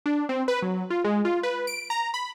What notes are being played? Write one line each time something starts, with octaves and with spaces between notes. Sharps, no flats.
D4
C4
B4
F#3
F4
G#3
F4
B4
D7
A#5
B5